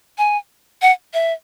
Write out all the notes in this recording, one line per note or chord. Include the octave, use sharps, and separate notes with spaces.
G#5
F#5
E5